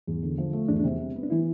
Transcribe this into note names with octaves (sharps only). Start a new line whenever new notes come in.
E2
D3
F3
A3
E2 D4
D4
C3
G3
B3
D4
E3 E4